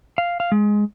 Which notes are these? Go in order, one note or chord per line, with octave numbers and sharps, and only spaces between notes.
F5
F5
G#3